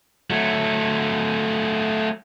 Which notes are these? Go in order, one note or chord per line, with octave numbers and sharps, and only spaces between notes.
F#3 A3